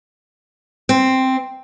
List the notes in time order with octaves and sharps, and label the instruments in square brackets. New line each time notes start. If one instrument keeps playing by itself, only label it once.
[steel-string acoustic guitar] C4